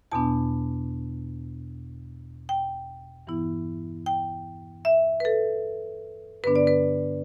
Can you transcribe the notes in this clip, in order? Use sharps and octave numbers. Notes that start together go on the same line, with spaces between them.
E2 B2 B3 D4 A5
G5
G2 E3 B3 E4
G5
E5
B4
A4
G2 D3 B3 D4 B4
D5
B4